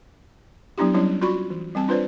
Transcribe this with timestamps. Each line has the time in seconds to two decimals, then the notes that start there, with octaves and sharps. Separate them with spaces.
0.78 F#3 B3 D4 E4 G4
0.94 F#3 G3 C#4 E4 C#5
1.21 F4 F#4 D5 B5 C#6
1.50 E3
1.75 G3 C4 A5
1.88 D4 F4 B4 C5 D5